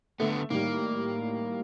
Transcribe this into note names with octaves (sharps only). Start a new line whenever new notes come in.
D3 A3 B3
A2 D#3 G3 A#3